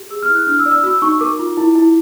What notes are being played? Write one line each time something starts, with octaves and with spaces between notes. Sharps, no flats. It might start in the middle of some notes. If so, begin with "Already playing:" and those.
Already playing: G4
G#4 E6
F6
E4
F#6
D4 F6
E6
D5
E6
F#4 E6
D#4 C#6
A#4 D6
F4
E4
E4